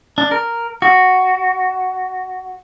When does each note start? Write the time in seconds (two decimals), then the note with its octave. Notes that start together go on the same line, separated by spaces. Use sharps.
0.18 D4
0.31 A#4
0.82 F#4